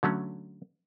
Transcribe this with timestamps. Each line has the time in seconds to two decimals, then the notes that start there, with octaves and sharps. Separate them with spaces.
0.03 D3 F#3 A3 C#4